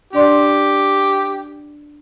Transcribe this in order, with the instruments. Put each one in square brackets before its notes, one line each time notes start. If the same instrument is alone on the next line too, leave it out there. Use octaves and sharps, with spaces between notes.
[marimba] D4 D5 C6 [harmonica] G4